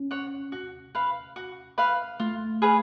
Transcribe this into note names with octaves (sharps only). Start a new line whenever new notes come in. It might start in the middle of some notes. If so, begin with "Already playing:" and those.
Already playing: C#4
C#5 F#5
F#4
B4 F5 B5
F#4
B4 F5 B5
A3 F4
G#4 B4 F5